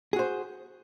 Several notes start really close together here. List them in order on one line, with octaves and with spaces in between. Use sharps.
G#4 F#4 C5